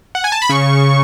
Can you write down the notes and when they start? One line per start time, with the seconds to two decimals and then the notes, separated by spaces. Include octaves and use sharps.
0.15 F#5
0.24 G#5
0.32 A5
0.42 B5
0.49 C#3 C#6